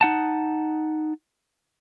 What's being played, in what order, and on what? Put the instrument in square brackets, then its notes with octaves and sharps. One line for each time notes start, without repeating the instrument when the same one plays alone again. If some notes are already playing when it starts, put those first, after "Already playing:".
[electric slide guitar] D#4 F#5 A5